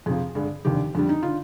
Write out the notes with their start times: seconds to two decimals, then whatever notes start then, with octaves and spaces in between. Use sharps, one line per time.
0.06 F2 C3 F3 G#4
0.35 G2 D3 G#3
0.65 F1 D#2 D3 G4
0.95 F2 D3 G3 D4
1.09 D#4
1.23 D3 F4